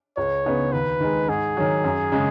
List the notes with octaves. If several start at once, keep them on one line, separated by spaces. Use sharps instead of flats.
C#2 C#5
C#3 B3 D#4
D#2 B4
D#3 G#3
G#2 G#4
D#3 F#3
F#2
C#3 G#3